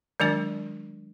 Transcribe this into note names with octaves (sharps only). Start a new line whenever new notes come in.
D#3 F#3 G#3 D4 D5